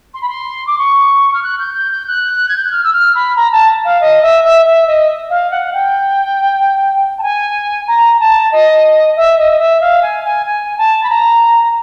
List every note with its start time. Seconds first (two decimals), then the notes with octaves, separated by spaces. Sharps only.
0.14 C6
0.21 B5
0.28 C6
0.67 D6
0.78 C#6
1.33 F6
1.43 F#6
1.59 G6
1.74 G6
1.91 G6
2.07 F#6
2.48 G#6
2.56 G6
2.64 F#6
2.71 F6
2.83 E6
2.92 F6
3.15 B5
3.36 A#5
3.52 A5
3.84 F5
4.00 D#5
4.22 E5
4.44 E5
4.65 E5
4.87 D#5
5.30 F5
5.51 F#5
5.73 G5
7.18 A5
7.22 G#5
7.87 A#5
8.20 A5
8.52 D#5
9.16 E5
9.38 D#5
9.51 D#5
9.59 E5
9.80 F5
10.02 G#5
10.24 G#5
10.46 G#5
10.78 A5
11.03 B5
11.09 A#5